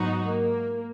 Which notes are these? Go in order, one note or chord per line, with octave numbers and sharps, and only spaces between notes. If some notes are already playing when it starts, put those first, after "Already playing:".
Already playing: G#2 F#3 B3 D#4 F#4
A#3